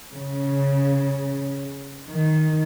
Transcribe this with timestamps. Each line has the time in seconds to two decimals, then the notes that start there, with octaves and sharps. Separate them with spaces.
0.13 C#3
2.09 D#3